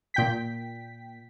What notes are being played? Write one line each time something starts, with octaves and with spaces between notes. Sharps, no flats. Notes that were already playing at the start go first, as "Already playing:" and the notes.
A#2 G5 B6